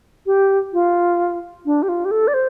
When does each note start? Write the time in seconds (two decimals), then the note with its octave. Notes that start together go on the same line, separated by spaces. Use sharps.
0.26 G4
0.73 F4
1.66 D4
1.83 G4
1.89 F4
2.05 G4
2.11 A4
2.28 D5
2.34 C5